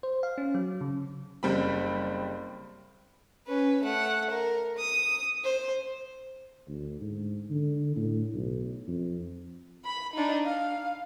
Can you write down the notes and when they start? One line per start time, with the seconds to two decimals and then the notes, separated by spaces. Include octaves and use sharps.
0.03 C5
0.23 F5
0.38 C#4
0.54 F#3
0.81 C#3
1.43 F#1 G3 C4 B5
3.46 C#4 B4
3.83 A3 F#5
4.30 A#4
4.78 D#6
5.44 C5
6.68 D2
7.01 G#2
7.50 D3
7.96 A2
8.34 B1
8.87 F2
9.85 B5
10.14 D4 D#4
10.45 F5